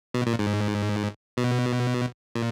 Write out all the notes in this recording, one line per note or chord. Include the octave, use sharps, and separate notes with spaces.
B2
A#2
G#2
B2
A#2